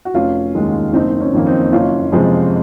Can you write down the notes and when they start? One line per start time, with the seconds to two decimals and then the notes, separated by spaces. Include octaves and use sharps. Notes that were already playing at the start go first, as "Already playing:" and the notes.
0.05 F#4
0.14 F1 C#4 F4
0.55 D#2 D#3 G#3
0.93 F#1 C4 D#4
1.20 C#4
1.33 F2 D#3 A#3
1.46 C4 D#4
1.72 F#1 C#4 F4
2.12 F2 C3 F3 G#3 G#4 C5